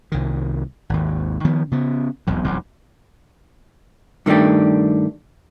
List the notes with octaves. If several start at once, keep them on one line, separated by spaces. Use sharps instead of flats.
C2 D#3
G#1 D#2
D#3 F3 B3
C#3 B3
E1 B1 F2
E1 B1 F2
G2 D#3 A3 D4 G4